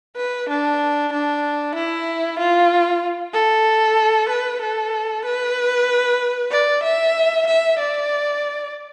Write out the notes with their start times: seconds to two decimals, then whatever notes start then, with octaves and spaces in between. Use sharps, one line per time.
0.17 B4
0.49 D4
1.13 D4
1.75 E4
2.39 F4
3.34 A4
4.29 B4
4.62 A4
5.25 B4
6.51 D5
6.84 E5
7.47 E5
7.79 D5